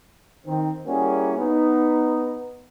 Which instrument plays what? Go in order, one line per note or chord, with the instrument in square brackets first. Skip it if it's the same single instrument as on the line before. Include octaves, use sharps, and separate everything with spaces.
[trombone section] D#3 C4
G3 A#3 C#4 E4 F#4 G#4
B3 D#4